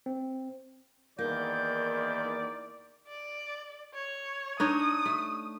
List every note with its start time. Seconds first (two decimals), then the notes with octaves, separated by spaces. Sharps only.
0.06 C4
1.19 E2 D#3 A#3 D5 G6
3.07 D5
3.94 C#5
4.60 D4 D#4 C#5 D#6
5.05 A3